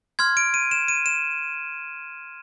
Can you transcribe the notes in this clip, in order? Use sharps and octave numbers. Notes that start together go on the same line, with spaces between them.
C6 F6 G#6
D7
D#7
E7
D#7
E7